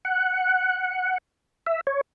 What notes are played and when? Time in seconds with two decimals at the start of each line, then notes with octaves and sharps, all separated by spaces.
0.05 F#5
1.67 E5
1.87 C#5